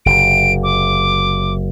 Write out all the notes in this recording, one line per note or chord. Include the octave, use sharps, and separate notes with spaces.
F#1 C3 D7
D6